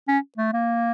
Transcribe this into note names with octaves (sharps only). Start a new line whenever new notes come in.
C#4
A3
A#3